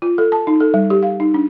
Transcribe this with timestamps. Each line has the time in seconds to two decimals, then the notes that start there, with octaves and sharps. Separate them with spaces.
0.02 F4
0.18 A4
0.32 A5
0.47 D#4
0.60 A4
0.74 G3
0.90 G4
1.03 F5
1.20 D#4
1.34 D4